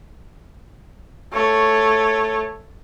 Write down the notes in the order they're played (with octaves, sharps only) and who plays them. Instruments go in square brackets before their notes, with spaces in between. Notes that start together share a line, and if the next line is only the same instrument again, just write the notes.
[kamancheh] A3 C#5